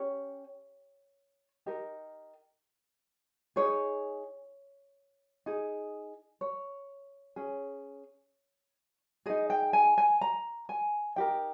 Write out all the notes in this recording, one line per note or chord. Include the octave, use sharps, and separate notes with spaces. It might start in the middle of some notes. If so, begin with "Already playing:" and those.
Already playing: C#4 G4 C#5
D#4 G4 A#4
D#4 G#4 C#5
D#4 G#4
C#5
C#4 G#4
D#4 G#4 D#5
G5
G#5
G#5
A#5
G#5
D#4 G4 A#4 G5